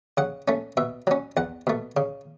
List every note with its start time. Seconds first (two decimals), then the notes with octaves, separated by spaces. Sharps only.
0.17 C#3 F#5
0.48 A3 C#4
0.77 B2 E5
1.07 F#3 C#4
1.37 E2 F#5
1.67 B2 A3
1.97 C#3